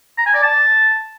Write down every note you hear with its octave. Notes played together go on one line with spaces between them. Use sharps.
A#5
G#5
D5
A5